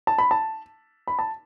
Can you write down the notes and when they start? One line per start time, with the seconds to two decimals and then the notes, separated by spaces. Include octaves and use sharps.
0.07 A5
0.18 B5
0.31 A5
1.08 B5
1.19 A5